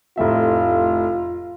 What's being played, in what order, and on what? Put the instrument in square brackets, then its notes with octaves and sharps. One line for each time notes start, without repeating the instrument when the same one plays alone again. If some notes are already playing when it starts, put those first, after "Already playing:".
[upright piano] F1 A2 E5 [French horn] F4